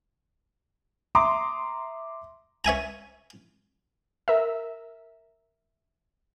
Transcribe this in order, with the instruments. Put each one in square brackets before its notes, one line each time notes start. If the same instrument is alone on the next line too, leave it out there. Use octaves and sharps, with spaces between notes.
[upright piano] E5 A#5 C6 D6 D#6
[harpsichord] C#5 E5 G#5 A#5
[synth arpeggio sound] A#4 E5